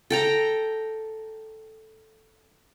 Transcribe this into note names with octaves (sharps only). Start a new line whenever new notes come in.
A4 G5 A#5